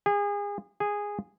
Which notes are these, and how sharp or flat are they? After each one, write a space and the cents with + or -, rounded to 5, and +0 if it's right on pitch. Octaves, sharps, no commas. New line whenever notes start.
G#4 -30
G#4 -10